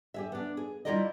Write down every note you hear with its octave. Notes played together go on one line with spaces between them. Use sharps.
G4 G#4 E5
B3 D4
G#4
G3 E4 F4 A#4 D5 D#5